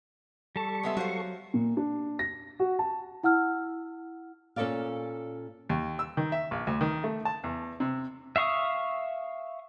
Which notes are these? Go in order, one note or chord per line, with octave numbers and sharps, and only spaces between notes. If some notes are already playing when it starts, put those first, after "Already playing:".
G3 A4 A5 C#6
G#3 B3 E5
F#3 F#4 C5 F5
A#2
D4
A#6
F#4
A5
E4 F#5 E6 F6
A#2 C#4 A4 A#4 D5 F5
D#2
E6
D#3
E5
A#1
D2
D#3
A3
A5
E2
C3
E5 F5 C#6 D#6